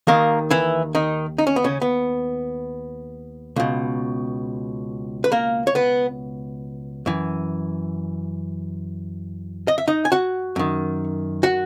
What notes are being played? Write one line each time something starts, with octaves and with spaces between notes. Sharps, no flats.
D#2 D#3 A#3 A#4
E3 E4
D#3 D#4
D#4
C#4
B3
C#3 C#4
B3
C#2 B2
B4
A#3 A#4
C#5
B3 B4
F#2 E3
D#5
E5
D#4 D#5
G#5
F#4 F#5
F#2 D#3
F#4 F#5